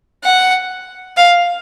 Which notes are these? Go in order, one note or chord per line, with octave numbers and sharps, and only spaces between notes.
F#5
F5